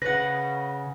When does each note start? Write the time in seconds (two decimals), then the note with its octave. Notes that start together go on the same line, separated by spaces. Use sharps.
0.02 C#3 B4 F#5 A#6